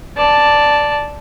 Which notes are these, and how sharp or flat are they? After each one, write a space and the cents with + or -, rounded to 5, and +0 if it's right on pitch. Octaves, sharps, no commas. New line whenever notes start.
D5 +0 A5 +0